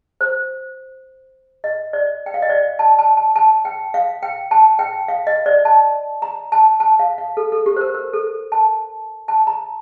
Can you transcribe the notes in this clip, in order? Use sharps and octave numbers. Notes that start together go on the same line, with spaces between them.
C5
D#5
D5
G5
F5
D#5
D5
A5
A5
A5
A5
G5
F5
G5
A5
G5
F5
D#5
D5
A5
A#5
A5
A5
F5
F5
A4
A4
G4
C5
A#4
A#4
A4
A5
A5
A#5